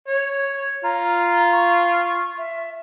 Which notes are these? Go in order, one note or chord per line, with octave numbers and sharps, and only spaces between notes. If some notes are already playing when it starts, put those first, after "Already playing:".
C#5
F4 A#5
C#6
E5